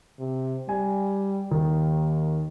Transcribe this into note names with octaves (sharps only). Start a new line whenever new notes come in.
C3
G3 G#5
D#2 D#3